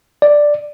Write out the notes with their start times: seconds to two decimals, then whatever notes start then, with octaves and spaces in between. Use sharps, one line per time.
0.22 D5